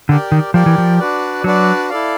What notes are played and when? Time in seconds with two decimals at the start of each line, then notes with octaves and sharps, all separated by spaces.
0.09 D3 G4 A#4 D5 G5
0.32 D#3
0.54 F3 G4 A#4 D5 G5
0.66 E3
0.78 F3
0.99 D4 F#4 B4 D5
1.44 F#3 D4 F#4 B4 D5
1.89 E4 A4 D5 F5